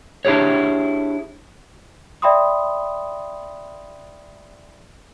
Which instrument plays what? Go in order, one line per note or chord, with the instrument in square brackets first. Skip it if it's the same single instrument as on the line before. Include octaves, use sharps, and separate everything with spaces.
[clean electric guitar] D4 E4 G4 G#4 C#5
[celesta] D5 E5 G5 B5 C6 D#6